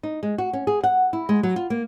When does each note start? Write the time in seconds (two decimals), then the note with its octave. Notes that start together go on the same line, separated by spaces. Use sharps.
0.03 D#4
0.23 G#3
0.38 F#4
0.53 C#4
0.67 G#4
0.84 F#5
1.13 E4
1.29 G#3
1.43 F#3
1.56 F4
1.70 A#3